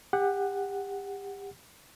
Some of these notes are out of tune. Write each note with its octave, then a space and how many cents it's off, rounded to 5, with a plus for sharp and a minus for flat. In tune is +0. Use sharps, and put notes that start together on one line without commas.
G4 +30 F#5 +0